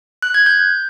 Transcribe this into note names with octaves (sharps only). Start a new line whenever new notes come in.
F#6
G#6
G6